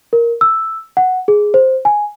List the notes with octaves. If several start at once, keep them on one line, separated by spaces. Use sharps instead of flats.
A#4
E6
F#5
G#4
C5
G#5